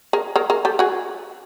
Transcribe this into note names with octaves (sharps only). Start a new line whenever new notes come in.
G#4 A#4
G#4 A#4
G#4 A#4
G4 A4
F#4 G#4